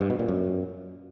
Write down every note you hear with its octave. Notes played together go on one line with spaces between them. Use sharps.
G2
B2
A#2
F#2